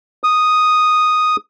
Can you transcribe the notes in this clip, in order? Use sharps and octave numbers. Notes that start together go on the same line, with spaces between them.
D#6